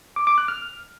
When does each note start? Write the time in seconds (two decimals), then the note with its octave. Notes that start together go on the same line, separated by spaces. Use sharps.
0.16 D6
0.27 D6
0.38 F#6
0.48 F6